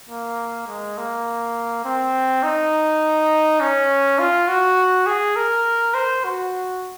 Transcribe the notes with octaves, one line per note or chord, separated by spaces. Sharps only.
A#3
G#3
A#3
C4
D#4
C#4
F4
F#4
G#4
A#4
C5
F#4